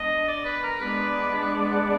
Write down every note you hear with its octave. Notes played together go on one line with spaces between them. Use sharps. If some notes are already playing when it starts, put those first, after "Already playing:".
Already playing: G#3 B3 D4 D#5
D5
B4
A#4
G#3 B3 D4 G#4 B4 D5
B4
F#5